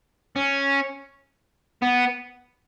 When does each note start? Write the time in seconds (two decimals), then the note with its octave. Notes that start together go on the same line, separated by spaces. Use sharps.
0.36 C#4
1.82 B3